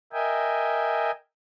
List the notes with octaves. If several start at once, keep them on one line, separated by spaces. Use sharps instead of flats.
A#4 D#5 E5 G5 G#5